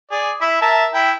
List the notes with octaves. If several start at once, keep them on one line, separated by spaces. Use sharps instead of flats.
G#4 D5
E4 E5
A#4 E5 A5
E4 G5